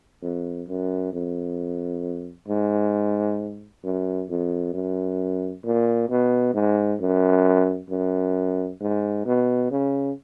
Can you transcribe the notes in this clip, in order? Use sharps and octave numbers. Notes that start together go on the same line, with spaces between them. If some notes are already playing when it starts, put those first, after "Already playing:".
F2
F#2
F2
G#2
F#2
F2
F#2
A#2
B2
G#2
F#2
F#2
G#2
B2
C#3